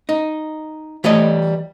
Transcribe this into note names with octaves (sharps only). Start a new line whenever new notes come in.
D#4
E3 G3 A3 C#5 D#5